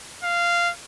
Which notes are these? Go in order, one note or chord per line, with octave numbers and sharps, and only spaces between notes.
F5